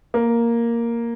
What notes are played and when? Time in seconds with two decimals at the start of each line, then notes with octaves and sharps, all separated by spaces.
0.14 A#3